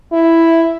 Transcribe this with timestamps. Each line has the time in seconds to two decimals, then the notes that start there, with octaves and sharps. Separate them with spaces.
0.13 E4